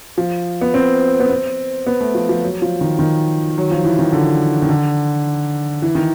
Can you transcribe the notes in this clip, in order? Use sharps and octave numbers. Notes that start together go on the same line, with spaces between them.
F3
B3
C4
B3
C4
B3
A3
F3
F3
F#3
F3
D#3
D#3
F#3
F3
E3
D#3
D3
D#3
D3
E3
D#3